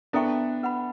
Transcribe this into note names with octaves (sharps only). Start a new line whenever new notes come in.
B3 D4 E4 A4 E5 G5 C#6
B4 F#5 B5